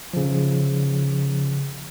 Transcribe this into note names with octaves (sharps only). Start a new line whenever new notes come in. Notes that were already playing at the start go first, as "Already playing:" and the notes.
C#3 F3